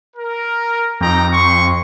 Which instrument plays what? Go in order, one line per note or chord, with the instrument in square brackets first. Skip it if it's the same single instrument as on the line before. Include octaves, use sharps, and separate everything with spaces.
[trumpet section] A#4
[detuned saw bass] F2 [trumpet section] D#4 G5 A#5
[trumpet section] C6 C#6